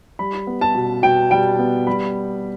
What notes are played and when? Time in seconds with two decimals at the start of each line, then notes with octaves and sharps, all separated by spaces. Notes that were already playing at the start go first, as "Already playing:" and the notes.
0.19 G3 B5
0.47 B3
0.61 A5
0.75 B2
1.03 B2 G5
1.31 G3 G5
1.59 B3
1.87 G3 B5